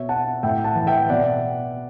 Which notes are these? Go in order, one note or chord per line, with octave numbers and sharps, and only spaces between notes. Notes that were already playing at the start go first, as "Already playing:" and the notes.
Already playing: B2 C#5 E5
F#5 A5
A2 E5 G5
F#5 A5
E3
E5 G5
B2 D5 F#5